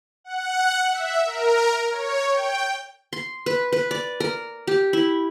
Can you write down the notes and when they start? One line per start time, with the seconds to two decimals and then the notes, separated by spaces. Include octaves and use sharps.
0.24 F#5
0.90 E5
1.25 A#4
1.91 C#5
2.30 G5
3.13 C6
3.46 B4
3.73 B4
3.91 D5
4.20 A#4
4.67 G4
4.93 E4